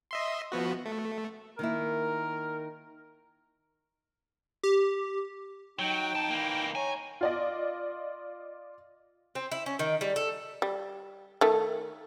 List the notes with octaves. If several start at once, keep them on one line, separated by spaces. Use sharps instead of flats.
D#5 E5 C6
F3 B3 F#4
A3
D#3 A#3 E4 A#4
G4
F#3 D#4 G5
F2 A5
E3 A#3
C#5 G#5 A#5
F4 D5 D#5
C4
E4
C#4
D#3
G3
A4
G3
D#3 A3